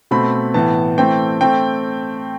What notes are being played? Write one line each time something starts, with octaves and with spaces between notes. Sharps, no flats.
B2 A3 C4 B5
A2 E3 B3 A5
E3 A3 C4 G5
A3 C4 G5